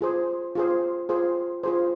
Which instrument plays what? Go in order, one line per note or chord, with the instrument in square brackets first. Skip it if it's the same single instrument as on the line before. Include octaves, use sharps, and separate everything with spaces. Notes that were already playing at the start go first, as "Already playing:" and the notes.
[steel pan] F4 G#4 C5
F4 G#4 C5
F4 G#4 C5
F4 G#4 C5